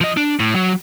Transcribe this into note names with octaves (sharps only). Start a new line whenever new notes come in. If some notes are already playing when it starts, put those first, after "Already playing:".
F3 D#5
D4
A2
F#3